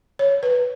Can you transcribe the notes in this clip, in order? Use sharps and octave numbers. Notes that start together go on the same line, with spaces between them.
C#5
B4